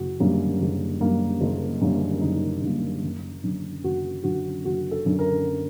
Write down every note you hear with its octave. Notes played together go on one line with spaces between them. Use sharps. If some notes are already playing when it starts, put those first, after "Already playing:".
Already playing: F#1 F#4
F#2 D3 G3 A#3
F#1
F#2 D3 G3 A#3
F#1
F#2 D3 G3 A#3
F#1 D#4
F#2 D3 G3 A#3
F#1
F#2 D3
F#1 F#4
F#2 D3 F#4
F#1 F#4
A4
F#2 D3
A#4